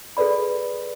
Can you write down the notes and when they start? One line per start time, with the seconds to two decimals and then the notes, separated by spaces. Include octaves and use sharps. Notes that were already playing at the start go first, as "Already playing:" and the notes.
0.17 G#4 A4 B4 D5 B5